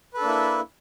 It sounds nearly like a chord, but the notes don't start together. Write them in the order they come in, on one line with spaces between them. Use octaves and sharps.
B4 A4 D4 A#3 E4